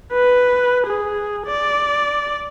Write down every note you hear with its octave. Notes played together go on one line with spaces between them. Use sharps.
B4
G#4
D5